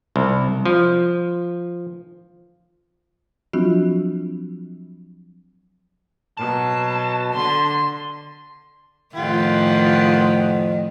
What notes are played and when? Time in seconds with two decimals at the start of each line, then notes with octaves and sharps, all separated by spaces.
0.16 C2
0.65 F3
3.53 F3 F#3 C4 D4 F4 F#4
6.37 B2 F#3 A5
7.34 D3 C6
9.16 F2 A2 D#3 F4 G4 F#5